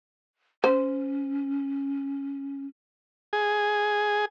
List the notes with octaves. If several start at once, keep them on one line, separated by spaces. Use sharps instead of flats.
C#4 C5
G#4